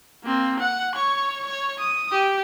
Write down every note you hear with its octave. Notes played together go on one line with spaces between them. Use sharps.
A#3 C4
F#5
C#5 C#6
C#5
D#6
G4